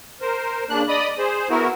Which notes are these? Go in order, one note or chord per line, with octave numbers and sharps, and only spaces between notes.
A#4 C5
C#3 A#3 D4 F#6
D5 D#5 B5 D#6
G#4 C5
B3 E4 F#4 A#4